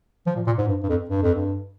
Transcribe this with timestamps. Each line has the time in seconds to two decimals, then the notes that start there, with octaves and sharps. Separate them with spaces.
0.26 F3
0.36 A#2
0.46 A#2
0.58 G#2
0.67 G2
0.83 G2
0.89 F2
1.09 G2
1.22 F2
1.35 G2